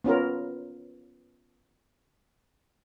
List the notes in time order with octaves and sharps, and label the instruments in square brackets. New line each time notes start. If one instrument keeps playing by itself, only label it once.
[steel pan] B3 C#4 F4 A#4